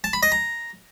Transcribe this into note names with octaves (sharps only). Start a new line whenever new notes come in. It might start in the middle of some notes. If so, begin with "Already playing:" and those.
A5
B5
D#5
A#5